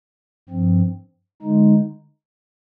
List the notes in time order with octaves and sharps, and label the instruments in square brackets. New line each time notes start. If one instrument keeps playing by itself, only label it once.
[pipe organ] G2 F3 C4
D3 G#3 D#4